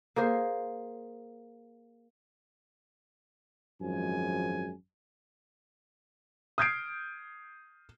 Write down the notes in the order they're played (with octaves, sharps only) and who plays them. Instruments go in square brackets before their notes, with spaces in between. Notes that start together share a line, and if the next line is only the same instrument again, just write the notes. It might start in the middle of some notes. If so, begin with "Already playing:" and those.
[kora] A#3 G#4 C5
[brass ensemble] G#1 F#2 F3 G#3 G#5
[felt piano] D#6 F6 G6 G#6 C7 D7